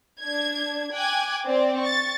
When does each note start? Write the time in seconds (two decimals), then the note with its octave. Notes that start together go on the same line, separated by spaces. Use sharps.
0.19 D4 G#6
0.95 G5 G#5 D6 F#6 G#6
1.46 C4 D5
1.80 C#6 A6